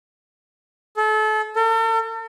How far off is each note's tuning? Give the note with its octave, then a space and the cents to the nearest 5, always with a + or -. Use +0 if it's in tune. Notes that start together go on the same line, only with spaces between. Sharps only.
A4 -35
A4 +45